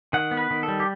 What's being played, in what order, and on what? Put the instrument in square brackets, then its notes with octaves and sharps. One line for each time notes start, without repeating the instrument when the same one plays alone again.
[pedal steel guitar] D#3 F#5
B3
B4
D#3
A4
G3
G4